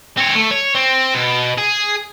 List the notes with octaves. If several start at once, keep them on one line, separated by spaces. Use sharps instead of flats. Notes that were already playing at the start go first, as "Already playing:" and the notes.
C4 C#5
A3
C#5
C4
B2
G#4